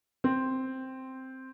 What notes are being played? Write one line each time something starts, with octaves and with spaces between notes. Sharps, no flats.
C4